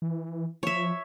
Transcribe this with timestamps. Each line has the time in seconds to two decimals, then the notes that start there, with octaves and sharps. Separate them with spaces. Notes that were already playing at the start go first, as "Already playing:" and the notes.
0.02 E3
0.63 F3 C#5 E5